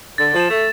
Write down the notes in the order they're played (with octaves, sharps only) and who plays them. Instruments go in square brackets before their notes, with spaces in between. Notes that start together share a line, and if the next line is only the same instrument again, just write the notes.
[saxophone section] D3 [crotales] A6
[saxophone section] F3
[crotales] E7
[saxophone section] A3